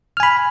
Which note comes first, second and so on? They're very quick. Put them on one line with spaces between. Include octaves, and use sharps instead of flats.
F6 G#5 B5